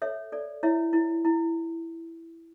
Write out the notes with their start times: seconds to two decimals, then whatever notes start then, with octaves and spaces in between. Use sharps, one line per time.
0.02 A4 C#5 E5
0.32 A4 D5
0.63 E4 C#5 E5
0.93 E4
1.25 E4